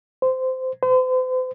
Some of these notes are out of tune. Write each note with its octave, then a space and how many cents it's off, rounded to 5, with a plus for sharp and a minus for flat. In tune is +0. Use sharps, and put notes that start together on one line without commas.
C5 -15
C5 -40